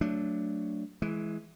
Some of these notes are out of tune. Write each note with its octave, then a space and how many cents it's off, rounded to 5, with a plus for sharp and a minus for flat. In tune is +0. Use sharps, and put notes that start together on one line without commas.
F#3 +0 A3 +20 D4 -5
E3 +0 G#3 +20